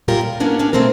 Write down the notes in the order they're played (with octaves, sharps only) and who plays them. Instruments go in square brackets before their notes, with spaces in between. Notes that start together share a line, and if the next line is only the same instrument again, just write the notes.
[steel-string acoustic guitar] F#2 A#2 G3 F4 G4 A#4
F4
A#3 B3 C#4 D4 A#4
A#3 C#4 D4
B2 A3 C4 C#4 A#4